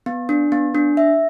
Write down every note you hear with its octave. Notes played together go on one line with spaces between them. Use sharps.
B3
D4
B3
D4
E5